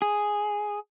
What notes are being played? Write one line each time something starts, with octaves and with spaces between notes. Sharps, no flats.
G#4